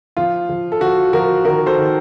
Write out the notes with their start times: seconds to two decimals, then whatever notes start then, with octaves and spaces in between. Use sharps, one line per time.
0.17 F3 F4
0.49 F3
0.72 A4
0.81 F3 F#4
1.13 F3 F#4 A#4
1.45 D#3 F#4 A#4
1.66 A4 C5
1.78 D#3